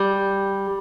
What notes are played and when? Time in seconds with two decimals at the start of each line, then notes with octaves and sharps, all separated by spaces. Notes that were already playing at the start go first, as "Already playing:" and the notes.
Already playing: G3